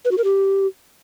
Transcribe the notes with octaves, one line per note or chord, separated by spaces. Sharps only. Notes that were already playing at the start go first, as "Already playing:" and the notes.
B4
F#4
A#4
G4